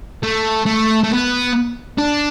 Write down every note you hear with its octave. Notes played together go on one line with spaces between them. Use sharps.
A3
A3
A3
B3
D4